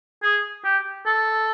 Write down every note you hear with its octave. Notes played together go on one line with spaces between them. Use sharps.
G#4
G4
A4